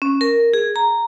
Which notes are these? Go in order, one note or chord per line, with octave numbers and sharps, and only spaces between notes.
C#4
A#4
G#4
A#5